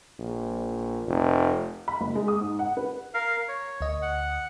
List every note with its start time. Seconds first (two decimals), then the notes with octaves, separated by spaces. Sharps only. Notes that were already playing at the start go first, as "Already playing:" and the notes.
0.19 A#1
1.07 F1
1.88 B5
2.01 F#1
2.15 G#3
2.28 D#6
2.41 G#2
2.59 F#5
2.77 B4
3.14 A#4 F5
3.48 C#5
3.81 D2 D#5
4.02 F#5